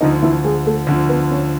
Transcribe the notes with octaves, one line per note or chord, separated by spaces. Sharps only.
D2 D3 F3 D#4
E3 E4
G#3 G#4
A3 A4
D2 D3 F3
B3 B4
C#4 C#5